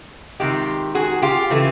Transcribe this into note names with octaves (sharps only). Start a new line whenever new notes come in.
C3 D#3 G#3 F4 G4
F#4 G#4
F4 G4
C#3 E3 A3